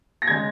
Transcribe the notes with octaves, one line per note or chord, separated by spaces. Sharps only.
A#6
C#3 G#3 G#6